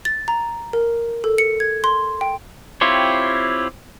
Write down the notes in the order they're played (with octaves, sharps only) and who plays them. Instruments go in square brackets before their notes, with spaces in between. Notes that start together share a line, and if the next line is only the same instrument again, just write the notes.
[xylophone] A6
A#5
A#4
A4
C#7
G#6
C6
G5
[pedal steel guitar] C4 E4 F4 G4 C#5